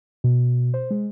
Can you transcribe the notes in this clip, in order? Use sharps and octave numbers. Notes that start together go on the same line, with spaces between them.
B2
C5
G#3